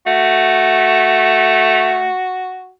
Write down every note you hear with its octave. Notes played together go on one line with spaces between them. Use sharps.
A3 F#4